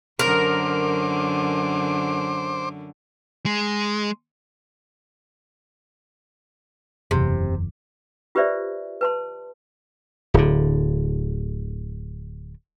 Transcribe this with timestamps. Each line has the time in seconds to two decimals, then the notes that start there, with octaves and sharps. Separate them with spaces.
0.19 F#2 D3 A#4 C5 D6
3.46 G#3
7.11 F#1 E2 C3
8.35 F4 G4 B4 C5 D5 E5
9.01 B4 A5 C6
10.34 D1 D3